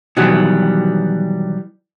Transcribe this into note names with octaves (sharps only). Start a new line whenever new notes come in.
B2 D#3 E3 F#3 G3